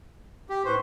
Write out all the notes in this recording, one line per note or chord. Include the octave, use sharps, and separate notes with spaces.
G4
A2 B4 C5 C6 C#6